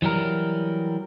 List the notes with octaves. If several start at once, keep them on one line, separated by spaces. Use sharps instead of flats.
E3 F#3 G3 A#4